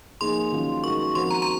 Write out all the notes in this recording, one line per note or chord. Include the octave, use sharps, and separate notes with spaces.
F3 A#3 D#4 G#4 C6
D#3 F#3 C#4 F4
G#3 D#4 F#4 A#4 C#6
F3 C4 F#4 A#4 C6
A#5
A#5